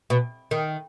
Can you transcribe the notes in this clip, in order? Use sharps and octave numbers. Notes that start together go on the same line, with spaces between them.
B2
D#3